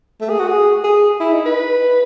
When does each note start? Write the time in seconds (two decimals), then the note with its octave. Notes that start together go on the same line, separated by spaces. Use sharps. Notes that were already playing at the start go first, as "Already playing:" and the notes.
0.21 A3
0.29 G#4
0.39 F#4
0.48 G#4
0.84 G#4
1.20 E4
1.32 D#4
1.45 B4